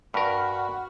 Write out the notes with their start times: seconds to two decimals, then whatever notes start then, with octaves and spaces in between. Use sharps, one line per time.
0.14 G2 F#4 A#4 B5 C#6 F6